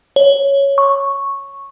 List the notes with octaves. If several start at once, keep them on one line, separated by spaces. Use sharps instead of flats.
C#5
C#6